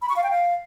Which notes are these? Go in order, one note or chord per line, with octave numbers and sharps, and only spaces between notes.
B5
C#6
F5
G5
F5